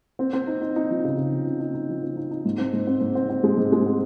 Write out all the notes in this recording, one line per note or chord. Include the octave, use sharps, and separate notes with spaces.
C4
C4
D#4
D#4
D#4
F3
C#3
C#3
F3
D#4
D#4
D#4
F3
C4
D#4
D#4
G#2
C4
G#2
C4
G#2
C4
C4
G#3
G#2
G#3
C4